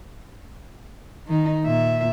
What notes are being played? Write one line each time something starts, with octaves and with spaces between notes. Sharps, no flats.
D#3 D#4
A#2 E5